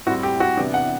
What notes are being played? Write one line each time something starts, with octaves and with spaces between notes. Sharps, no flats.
A2 G3 C4 F#4
G4
F#4
C3 E3 B3 D4 G4
F#5